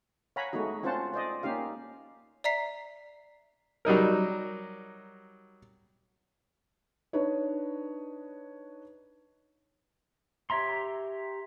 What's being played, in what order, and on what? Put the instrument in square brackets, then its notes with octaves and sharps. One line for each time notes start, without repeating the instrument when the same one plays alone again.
[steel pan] C#5 F5 F#5 G#5 A#5 B5
G#3 A3 B3 D#4 F#4
C4 C#4 F4 C5 F#5 A5
C5 D5 D#5
A#3 C#4 D#4 G4 F5
[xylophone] D5 E5 A#5 B6 C7
[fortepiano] F#3 G3 D#4 A#4
[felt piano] D4 D#4 B4 C#5
[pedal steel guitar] G4 C#5 E5 A#5 C6